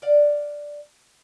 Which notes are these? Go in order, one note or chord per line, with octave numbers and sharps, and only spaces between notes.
D5 F5 F#5